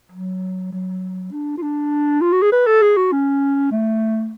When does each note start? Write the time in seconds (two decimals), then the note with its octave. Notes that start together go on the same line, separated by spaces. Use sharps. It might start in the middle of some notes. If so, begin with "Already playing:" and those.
0.12 F#3
0.72 F#3
1.31 D4
1.57 F4
1.62 D4
2.21 F4
2.32 F#4
2.42 G#4
2.52 B4
2.67 A4
2.82 G#4
2.97 F#4
3.12 C#4
3.71 A3